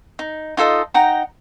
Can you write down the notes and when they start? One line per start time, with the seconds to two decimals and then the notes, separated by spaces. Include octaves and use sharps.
0.19 D#4
0.57 D#4 F4 A4 D#5
0.94 D#4 F#5 G5 A#5